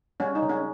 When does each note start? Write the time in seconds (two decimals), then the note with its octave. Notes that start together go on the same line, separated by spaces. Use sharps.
0.20 G3 C#4
0.35 D#4
0.42 C#3
0.49 C#4